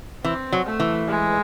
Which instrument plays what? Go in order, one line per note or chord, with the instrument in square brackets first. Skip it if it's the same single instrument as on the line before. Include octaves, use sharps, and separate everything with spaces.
[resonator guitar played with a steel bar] E3 [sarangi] C4
[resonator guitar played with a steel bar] F#3
[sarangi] A3
[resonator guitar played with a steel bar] E3
[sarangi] G#3